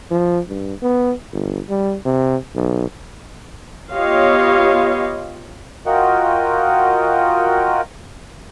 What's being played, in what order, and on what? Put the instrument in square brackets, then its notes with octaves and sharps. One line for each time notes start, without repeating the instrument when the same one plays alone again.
[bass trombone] F3
G2
B3
G1
G3
C3
B1
[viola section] B3 F4 G4 C#5 D#5 F5
[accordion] F4 F#4 A#4 D#5 F#5 G5